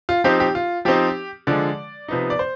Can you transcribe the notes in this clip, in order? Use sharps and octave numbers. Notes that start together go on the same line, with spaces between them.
F4
F3 C4 D#4 G4
G4
F4
F3 C4 D#4 G4
D3 F3 G#3 D5
C3 F3 B3 D#4
D5
C5